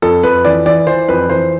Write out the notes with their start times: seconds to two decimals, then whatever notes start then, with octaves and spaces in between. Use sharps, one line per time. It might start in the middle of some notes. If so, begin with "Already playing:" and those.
0.02 F2 A4
0.23 F2 B4
0.45 E3 D5
0.66 E3 D5
0.87 E3 C5
1.08 F2 B4
1.30 E3 C5